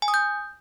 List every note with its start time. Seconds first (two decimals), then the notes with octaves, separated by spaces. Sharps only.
0.02 G#5
0.08 D#6
0.14 G6